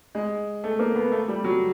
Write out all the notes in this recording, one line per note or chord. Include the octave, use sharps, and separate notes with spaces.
G#3
A3
A#3
B3
A3
G3
F#3